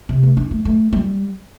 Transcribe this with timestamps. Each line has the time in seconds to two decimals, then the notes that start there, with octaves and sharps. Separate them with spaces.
0.09 C3
0.23 A3
0.37 D4
0.51 A3
0.65 A3
0.93 G3